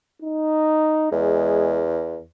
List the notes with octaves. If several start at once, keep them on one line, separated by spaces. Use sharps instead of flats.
D#4
E2 G#3